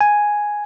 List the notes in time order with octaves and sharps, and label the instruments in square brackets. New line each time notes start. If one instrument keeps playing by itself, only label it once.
[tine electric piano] G#5